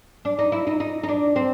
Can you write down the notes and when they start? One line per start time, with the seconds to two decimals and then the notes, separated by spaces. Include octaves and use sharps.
0.25 D4
0.39 D#4
0.52 E4
0.67 D#4
0.80 D#4
1.03 D#4
1.09 D4
1.36 C4